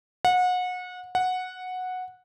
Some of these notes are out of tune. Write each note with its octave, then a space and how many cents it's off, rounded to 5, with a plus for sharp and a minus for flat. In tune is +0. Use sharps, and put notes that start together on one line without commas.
F#5 -30
F#5 -10